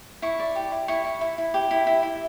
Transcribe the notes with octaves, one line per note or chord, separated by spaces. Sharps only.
E4 C#6
D5
G4
E4
E4 C#6
E4
E4
E4
G4
E4
E4
E4